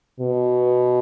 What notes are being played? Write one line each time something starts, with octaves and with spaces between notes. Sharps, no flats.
B2